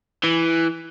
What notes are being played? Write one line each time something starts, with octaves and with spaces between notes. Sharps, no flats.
E3